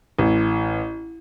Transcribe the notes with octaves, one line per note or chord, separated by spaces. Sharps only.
A1